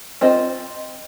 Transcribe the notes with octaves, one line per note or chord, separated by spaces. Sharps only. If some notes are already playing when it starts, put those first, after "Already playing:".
C4 F4 C5 D#5